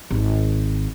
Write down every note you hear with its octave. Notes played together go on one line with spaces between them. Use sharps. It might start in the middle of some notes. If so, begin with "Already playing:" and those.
G#1